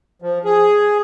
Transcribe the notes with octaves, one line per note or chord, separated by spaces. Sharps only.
F3
G#4